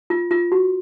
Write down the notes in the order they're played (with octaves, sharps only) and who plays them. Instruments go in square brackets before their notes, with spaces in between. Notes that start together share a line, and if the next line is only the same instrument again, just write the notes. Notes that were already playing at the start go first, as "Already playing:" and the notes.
[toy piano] F4
F4
F#4